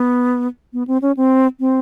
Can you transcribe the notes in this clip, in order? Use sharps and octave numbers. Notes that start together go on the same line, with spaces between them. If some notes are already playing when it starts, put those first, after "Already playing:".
Already playing: B3
B3
C4
C#4
C4
C4